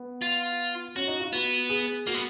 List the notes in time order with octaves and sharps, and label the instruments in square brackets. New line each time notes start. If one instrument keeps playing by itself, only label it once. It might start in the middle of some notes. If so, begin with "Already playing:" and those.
Already playing: [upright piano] B3
[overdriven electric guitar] F4
[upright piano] C#4 [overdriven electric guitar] F#4
[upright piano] D#4
F4
[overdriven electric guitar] B3 [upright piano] F#4
[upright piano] G#4
[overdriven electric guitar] A#3 [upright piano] F#4
[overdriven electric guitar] B3